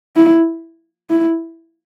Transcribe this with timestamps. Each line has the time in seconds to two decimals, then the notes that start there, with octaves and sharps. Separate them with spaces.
0.16 E4
1.10 E4